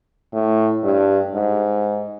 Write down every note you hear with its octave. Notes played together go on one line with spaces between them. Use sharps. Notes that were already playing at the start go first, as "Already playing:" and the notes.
A2
G2
G#2